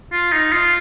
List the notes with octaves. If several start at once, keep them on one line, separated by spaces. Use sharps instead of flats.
F4
D#4
F4